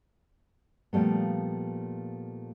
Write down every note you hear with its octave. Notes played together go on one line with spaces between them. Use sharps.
A#2 F3 G3 A3 B3